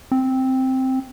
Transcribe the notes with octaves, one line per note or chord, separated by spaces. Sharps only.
C4